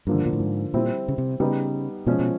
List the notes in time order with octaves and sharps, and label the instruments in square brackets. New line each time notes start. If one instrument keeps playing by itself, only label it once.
[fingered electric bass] G2 [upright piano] D3 F3 A#3
[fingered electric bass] A#2
A2
G#2
[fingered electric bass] A#2 [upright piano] G3 C4 E4
[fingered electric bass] C#3
C3
[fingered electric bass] C#3 [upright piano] G3 B3 D#4
[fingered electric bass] B2 [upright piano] F3 G#3 C#4
[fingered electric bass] B2